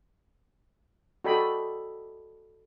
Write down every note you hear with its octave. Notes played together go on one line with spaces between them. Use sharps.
F#4 A4 D5 D#5 G5 B5